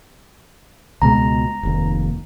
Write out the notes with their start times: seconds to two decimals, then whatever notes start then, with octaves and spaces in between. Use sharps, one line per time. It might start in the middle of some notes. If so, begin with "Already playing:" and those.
1.02 C#2 B2 G#3 A#5
1.63 F1 D#2